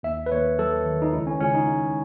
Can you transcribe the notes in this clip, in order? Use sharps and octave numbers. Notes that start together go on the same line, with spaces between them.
D#2 E5
B4
D#2 C#5
F#3 A4
D#3
D#4
C#2 E4
C#4
C#2 C#4
D#4
G#3